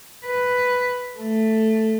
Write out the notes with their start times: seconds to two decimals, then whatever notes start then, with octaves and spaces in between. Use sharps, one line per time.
0.25 B4
1.19 A3